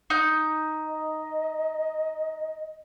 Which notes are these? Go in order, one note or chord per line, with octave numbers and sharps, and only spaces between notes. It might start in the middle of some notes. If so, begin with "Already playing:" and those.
D#4 G6
D#5